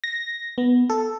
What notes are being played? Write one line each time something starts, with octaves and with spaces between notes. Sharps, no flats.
A#6
B3
A4